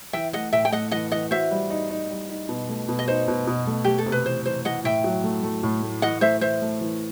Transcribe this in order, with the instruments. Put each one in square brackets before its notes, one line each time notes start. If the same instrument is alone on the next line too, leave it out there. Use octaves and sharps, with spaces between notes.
[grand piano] E3 [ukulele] E5 G5
[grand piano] A3 [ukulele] D#5 F#5
[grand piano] A2 [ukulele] E5 G5
[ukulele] G5
[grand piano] A3 [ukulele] D#5 F#5
[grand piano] E3 [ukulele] D#5 F#5
[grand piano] E3 [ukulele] D#5 F#5
[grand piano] F#4 [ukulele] C5 E5
[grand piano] G3
D#4
D#4
G3
D#4
B2
A3
B2
[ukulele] D#5
[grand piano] D#4 [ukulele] C5
[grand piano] B2
B2
A3
[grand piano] A3 [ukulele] G4
[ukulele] A4
[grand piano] C3
[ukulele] B4
[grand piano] E3 [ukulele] C5
[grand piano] E3 [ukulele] C5
[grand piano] E3 [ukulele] D#5 F#5
[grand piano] A2 [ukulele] E5 G5
[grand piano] F#3
A3
A3
A2
A3
[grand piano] E3 [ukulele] D#5 F#5
[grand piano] A3 [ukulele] C5 E5
[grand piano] E3 [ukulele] C5 E5
[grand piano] A3
E3